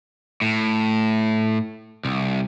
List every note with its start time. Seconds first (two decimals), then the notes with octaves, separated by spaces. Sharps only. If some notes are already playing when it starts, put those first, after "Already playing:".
0.42 A2
2.05 C2